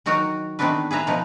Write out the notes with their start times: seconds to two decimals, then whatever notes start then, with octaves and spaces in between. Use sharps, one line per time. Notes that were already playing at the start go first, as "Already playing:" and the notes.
0.06 D#3 F#3 D#4 F#4 A#4
0.59 D#3 A3 B3 C4 D4 B4
0.91 G#4 B4 E5 A#5
1.07 B2 F3 B3 D#4